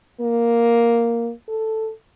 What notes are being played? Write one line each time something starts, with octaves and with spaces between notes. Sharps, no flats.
A#3
A4